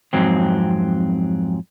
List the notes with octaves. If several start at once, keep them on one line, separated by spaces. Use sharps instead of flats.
F2 G#2 F#3 C4